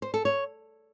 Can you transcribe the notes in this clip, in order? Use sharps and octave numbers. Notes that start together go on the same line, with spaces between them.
C5
A4
C#5